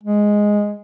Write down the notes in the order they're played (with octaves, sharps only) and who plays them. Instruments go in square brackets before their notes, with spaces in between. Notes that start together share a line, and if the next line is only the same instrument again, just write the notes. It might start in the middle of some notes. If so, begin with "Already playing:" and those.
[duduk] G#3